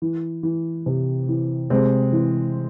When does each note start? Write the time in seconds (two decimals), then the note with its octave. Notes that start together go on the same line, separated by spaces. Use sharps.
0.02 E3
0.43 E3
0.86 C3
1.29 E3
1.70 C3 G#3 C4
2.12 E3